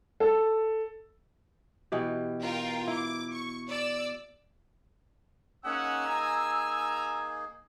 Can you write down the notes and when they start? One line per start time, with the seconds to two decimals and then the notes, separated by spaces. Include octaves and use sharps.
0.20 A4
1.92 B2 E3 G4
2.42 F4 A#4 G5
2.88 E4 D6
3.32 C#6
3.68 D5 E6
5.65 A#3 C#4 D#4 G#4 F#5 E6
6.07 G#5 A#5